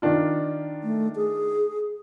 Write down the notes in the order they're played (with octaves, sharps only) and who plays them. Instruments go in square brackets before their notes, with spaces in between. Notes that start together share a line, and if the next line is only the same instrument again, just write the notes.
[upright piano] D#3 D4 F4
[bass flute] A3
G#4